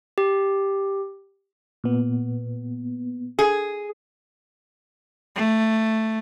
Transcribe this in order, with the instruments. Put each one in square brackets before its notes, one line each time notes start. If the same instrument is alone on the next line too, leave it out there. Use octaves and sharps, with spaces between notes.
[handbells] G4
[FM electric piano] A#2 B3
[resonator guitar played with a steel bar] G#4
[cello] A3